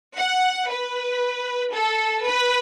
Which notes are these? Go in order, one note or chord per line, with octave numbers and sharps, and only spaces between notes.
F#5
B4
A4
B4